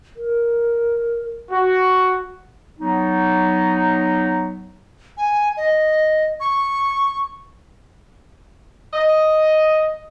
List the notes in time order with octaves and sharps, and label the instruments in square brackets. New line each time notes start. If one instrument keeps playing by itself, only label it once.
[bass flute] A#4
[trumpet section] F#4
[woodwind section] F#3 B3 D#4
[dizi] G#5
D#5
C#6
[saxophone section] D#5